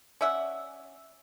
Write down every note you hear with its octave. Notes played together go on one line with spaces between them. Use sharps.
C#4 D5 E5 F#5